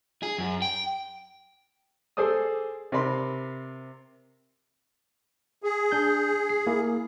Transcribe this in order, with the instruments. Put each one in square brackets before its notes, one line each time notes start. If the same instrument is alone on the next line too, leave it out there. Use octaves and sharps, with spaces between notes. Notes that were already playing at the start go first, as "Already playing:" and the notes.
[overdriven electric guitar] G#4
F#2
G5
[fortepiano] G#4 A4 C5 D5 D#6
C3 A#4 D5 B5 C6
[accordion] G#4
[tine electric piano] D4 G6
C7
A#3 E4